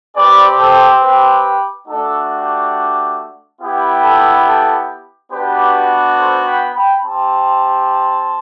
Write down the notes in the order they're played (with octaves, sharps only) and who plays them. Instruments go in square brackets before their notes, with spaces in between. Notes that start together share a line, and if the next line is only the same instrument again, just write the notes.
[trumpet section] C4 G4 B4 D5
A4 C5
G4 B4
A3 D4 F#4 A4
G4
B3 E4 G4
A4
A4
B3 D4 F#4 G4 B4
A4 C5
G5 B5
G5 B5
C4 G4 A5 C6